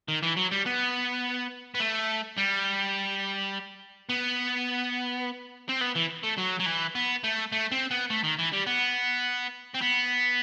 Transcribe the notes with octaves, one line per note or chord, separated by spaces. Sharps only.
D#3
E3
F#3
G3
B3
B3
A3
G3
B3
C4
B3
E3
A3
F#3
F#3
E3
B3
A3
A3
C4
B3
A3
D#3
E3
G3
B3
C4
B3